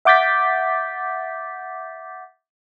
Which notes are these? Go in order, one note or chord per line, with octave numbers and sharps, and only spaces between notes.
E5 F#5 D6 G6 A6 B6